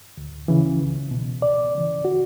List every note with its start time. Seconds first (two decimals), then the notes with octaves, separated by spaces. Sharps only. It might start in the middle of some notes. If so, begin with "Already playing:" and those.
0.17 D2
0.48 C#3 E3
0.81 C#2
1.11 B2
1.42 C#2 D5
1.75 C#3 E3
2.05 F#4